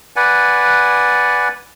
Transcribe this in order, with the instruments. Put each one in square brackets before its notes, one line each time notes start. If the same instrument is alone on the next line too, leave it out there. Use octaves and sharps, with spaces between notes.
[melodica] B4 D5 F#5 G#5